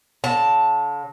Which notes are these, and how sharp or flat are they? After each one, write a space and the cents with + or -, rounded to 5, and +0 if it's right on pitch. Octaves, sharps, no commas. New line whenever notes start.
D3 -45 A5 +0